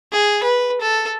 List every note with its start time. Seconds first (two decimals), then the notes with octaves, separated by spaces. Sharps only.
0.12 G#4
0.44 B4
0.81 A4